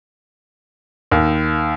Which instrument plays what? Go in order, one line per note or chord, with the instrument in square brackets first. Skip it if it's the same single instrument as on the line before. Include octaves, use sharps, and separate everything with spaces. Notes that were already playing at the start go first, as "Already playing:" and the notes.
[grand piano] D#2